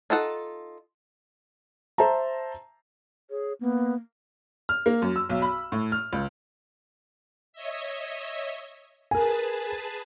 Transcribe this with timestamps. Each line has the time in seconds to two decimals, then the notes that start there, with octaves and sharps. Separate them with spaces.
0.10 D#4 F4 A4 F#5
1.98 C5 E5 A5 A#5
3.30 G#4 C#5
3.61 A#3 B3
4.69 F6
4.86 A#3
5.02 F#2
5.16 E6
5.29 B1
5.42 B5
5.72 A2
5.92 F6
6.13 C#2
7.53 C#5 D#5 E5
9.11 G#4 A#4 B4 G#5 A5